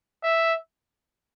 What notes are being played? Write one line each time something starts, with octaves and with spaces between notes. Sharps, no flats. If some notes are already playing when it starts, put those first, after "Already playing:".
E5